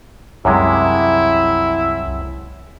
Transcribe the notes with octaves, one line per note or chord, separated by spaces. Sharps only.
C2 F#2 C3 G#3 E4